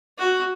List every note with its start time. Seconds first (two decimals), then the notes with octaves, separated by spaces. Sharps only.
0.18 F#4